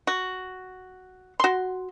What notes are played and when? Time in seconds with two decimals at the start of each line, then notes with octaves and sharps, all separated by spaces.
0.07 F#4
1.40 F#4 C6